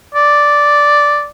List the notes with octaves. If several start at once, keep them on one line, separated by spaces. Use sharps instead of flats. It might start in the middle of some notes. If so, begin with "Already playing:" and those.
D5